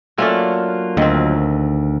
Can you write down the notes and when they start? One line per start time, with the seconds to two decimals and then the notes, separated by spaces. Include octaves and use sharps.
0.18 F#3 A3 A#3 C#4 D4 F4
0.97 D2 D#3 C4